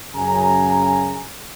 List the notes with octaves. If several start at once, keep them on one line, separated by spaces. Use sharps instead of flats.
F#2 C#3 G#5 A#5